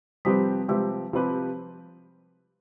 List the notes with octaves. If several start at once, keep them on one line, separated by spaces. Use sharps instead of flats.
C3 F3 G3 C4 G4 B4
C3 F3 G#3 C4 G4 B4
C3 F3 C4 G4 B4